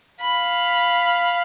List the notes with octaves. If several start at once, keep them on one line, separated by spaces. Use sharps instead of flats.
F5 B5